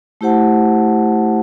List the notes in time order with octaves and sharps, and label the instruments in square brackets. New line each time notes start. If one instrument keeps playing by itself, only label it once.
[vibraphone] A3 E4 G4 C5 F#5 A5